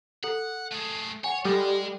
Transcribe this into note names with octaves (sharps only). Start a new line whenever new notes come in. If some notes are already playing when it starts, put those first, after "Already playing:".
A4 F#5
A3 G#4
C#5 F#5 G#5
G3 G#3 A4